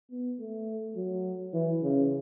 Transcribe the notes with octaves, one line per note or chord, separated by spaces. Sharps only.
B3
A3
F#3
E3
C#3